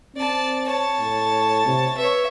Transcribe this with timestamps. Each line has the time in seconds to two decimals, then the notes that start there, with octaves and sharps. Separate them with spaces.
0.16 C4 D5 A5
0.68 C#5 A5
1.01 A2
1.66 C3
1.98 B4 C#5 E5